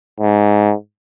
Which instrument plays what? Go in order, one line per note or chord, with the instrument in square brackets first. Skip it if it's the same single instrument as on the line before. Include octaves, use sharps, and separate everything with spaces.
[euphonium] G#2